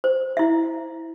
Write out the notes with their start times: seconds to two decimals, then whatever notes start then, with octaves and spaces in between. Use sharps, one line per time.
0.04 C5
0.37 E4 E5